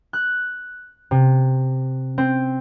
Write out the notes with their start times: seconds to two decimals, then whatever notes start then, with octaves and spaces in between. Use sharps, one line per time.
0.13 F#6
1.11 C3
2.18 C4